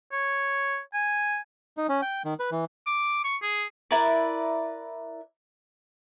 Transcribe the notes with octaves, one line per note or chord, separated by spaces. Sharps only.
C#5
G#5
D#4
C#4
G5
D#3
B4
E3
D6
C#6
G#4
E4 A#4 B4 D5